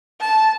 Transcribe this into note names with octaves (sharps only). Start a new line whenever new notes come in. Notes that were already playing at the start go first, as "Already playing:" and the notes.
A5